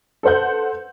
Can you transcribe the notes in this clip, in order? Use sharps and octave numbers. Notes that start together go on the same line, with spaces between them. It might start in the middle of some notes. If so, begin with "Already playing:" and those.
A4 B4 C5 F#5 G6